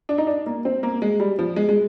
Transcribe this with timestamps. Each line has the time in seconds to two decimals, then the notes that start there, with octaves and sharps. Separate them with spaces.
0.09 D4
0.18 D#4
0.27 D4
0.46 A#3
0.65 C4
0.83 A#3
1.02 G#3
1.20 G3
1.39 F3
1.56 G#3
1.69 G#3